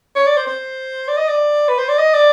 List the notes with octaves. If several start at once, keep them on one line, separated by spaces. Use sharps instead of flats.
C#5
D5
C5
C5
D5
D#5
D5
B4
C5
D5
D#5
D5